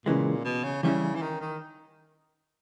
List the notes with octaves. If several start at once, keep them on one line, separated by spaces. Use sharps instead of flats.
A#2 C#3 E3 G#3
B2
C#3
C#3 E3 G3 C#4 E4
E3
D#3
D#3